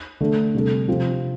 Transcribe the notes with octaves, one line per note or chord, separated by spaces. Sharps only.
D3 A3 D4 A4
C3 G3 D4 A4
C3 F3 C4 G4